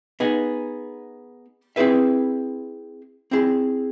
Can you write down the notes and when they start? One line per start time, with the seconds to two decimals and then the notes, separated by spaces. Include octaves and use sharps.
0.20 B3 D#4 G#4
1.76 C4 E4 G#4 B4 E5
3.31 C4 E4 G#4